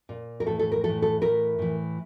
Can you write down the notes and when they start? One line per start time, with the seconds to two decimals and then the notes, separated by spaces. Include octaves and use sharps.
0.09 A#2
0.40 A#4
0.46 A2 E3 A4
0.59 A4
0.72 A#4
0.83 A2 E3 A4
1.02 A4
1.21 A2 E3 A#4
1.59 A2 E3